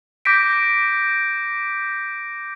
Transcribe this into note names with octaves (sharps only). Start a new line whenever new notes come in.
D6 G6 A#6 B6 D7